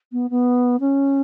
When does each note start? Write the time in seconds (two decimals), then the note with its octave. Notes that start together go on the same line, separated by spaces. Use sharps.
0.12 B3
0.30 B3
0.80 C#4